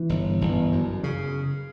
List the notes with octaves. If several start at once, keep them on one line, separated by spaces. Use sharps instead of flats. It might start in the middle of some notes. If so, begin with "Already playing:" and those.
Already playing: E3
G1
G1
F#2
C#3